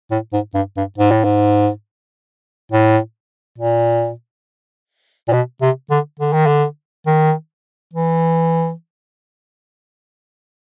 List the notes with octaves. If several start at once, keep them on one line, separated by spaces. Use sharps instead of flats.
A2
G#2
G2
G2
G#2
A2
G#2
A2
A#2
A#2
B2
C3
D3
D3
D#3
D3
D#3
E3